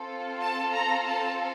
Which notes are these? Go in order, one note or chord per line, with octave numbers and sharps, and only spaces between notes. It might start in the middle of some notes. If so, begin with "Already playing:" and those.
Already playing: C4 F4 A4
A5
A#5
A5